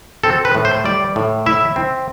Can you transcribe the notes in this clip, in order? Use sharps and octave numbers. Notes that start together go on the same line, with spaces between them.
C4 A4
B4
A2
C5
G3 D5
A2
E4 E5
C4